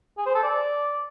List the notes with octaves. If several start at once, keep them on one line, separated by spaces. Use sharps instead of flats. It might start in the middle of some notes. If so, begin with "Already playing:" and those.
G#4
C5
A4
D5